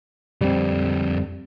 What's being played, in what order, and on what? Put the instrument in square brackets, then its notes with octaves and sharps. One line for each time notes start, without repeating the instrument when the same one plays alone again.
[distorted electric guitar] F2 D3 [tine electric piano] G3 C4